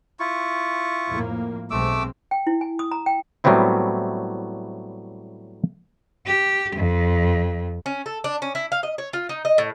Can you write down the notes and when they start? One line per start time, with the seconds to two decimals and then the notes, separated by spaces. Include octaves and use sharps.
0.20 E4 F4 C#6
1.09 F2 A2 A#3
1.71 B1 G#3 A3 C4 D6 E6
2.31 G5
2.47 E4
2.61 G#5
2.79 D#6
2.91 A#5
3.06 G5
3.44 A2 F#3 G3 B3 C4 E4
6.26 G4
6.76 F2
7.86 C#4
8.06 A4
8.24 D4
8.42 C#4
8.55 E4
8.72 F5
8.83 D#5
8.98 C#5
9.13 F4
9.29 D#4
9.45 D#5
9.58 A2